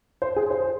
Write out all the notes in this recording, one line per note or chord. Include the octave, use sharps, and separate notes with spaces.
C5
G#4
C5